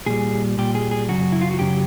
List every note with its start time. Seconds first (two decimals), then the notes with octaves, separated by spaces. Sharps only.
0.06 A#2 G3 G#4
0.58 A#2 G3 G4
0.75 G#4
0.91 G#4
1.09 F#2 C#3 F#3 F#4
1.32 E4
1.41 F4
1.51 F#4
1.59 F#2 C#3 F#3 G4